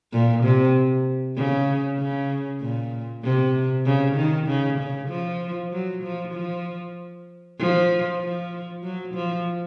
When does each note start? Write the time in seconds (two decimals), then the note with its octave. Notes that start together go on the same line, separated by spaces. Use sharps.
0.12 A#2
0.43 C3
1.36 C#3
1.99 C#3
2.61 A#2
3.23 C3
3.86 C#3
4.16 D#3
4.48 C#3
4.79 C#3
5.09 F3
5.72 F#3
6.03 F3
6.34 F3
7.59 F3
8.21 F3
8.83 F#3
9.14 F3